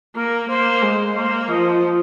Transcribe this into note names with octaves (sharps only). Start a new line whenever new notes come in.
A#3 A#4
A#3 C5
G#3
A#3 C5
F3 D#5